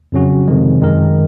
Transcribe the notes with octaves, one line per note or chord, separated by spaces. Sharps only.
F2 C#3 F#3 C#4 F#4
F2 C3 D#3 G#3
F#2 D#3 G#3 D#4 A#4